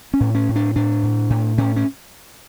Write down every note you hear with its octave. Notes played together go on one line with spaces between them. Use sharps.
C#4
A2
C#4
A2
D4
A2 D4
A2
A2
A2 C#4
C#4